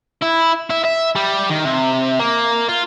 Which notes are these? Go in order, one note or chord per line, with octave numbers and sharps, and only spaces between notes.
E4
E4
E5
G3
D#3
C3
A#3
F4